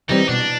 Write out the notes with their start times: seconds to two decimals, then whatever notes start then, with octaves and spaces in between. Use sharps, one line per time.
0.09 E3 G3 C4 D#4
0.29 B2 D4